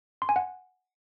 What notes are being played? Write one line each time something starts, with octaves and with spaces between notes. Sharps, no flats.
C6
G#5
F#5